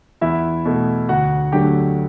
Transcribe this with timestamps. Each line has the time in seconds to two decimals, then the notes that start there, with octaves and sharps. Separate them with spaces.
0.21 E2 E4 E5
0.65 B2 A3
1.09 D2 F#4 F#5
1.52 D3 F#3 A3 G4 G5